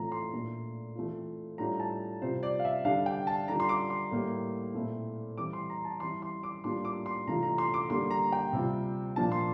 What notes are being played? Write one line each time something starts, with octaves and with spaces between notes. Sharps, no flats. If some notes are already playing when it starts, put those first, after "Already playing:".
Already playing: A2 E3 A3 C4 F4 A#5
C6
A#2 A3 D4
E3 A3 C4 F4
A2 G3 D4 F4 A#5
A5
C3 G3 C4 F4 C5
D5
F5
E5
D3 G3 D4 F5
G5
A5
D3 G3 D4 F4 A#5
C6
D6
C6
A2 G3 A#3
A#2 A3 C4 E4
E3 G3 C4 D6
C6
A#5
A5
E3 G3 C4 E4 C6
C6
D6
A2 G3 A#3 D4 F4 C6
D6
C6
C3 E3 A3 D4 F4 A#5
A#5
C6
D6
D3 G3 A#3 C6
A#5
G5
C3 G3 C4 F4
A#2 F3 A#3 D4 F4 A5
C6